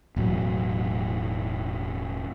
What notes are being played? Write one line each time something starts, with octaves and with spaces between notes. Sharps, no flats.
E1 A2 F#3